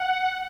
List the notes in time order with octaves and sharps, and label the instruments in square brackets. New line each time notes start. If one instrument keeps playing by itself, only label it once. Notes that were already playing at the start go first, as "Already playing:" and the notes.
Already playing: [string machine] F#5